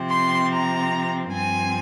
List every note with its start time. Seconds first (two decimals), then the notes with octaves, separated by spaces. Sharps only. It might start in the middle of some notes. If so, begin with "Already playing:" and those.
Already playing: C3 F3 C4
0.10 C6
0.51 A#5
1.33 G2 F3 C4 G#5